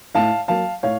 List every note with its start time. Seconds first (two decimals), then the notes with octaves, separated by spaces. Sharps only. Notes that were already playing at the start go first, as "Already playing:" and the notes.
0.15 A2 F5 A5
0.48 F#3 A#3 F5 A5
0.83 A2 C#5 F5